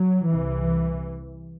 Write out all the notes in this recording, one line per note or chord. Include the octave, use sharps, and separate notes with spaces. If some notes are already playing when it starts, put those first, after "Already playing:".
Already playing: F#3
C2 C3 E3